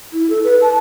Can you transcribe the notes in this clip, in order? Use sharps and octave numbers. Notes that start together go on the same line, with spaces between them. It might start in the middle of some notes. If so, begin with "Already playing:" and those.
E4
A4
B4
A5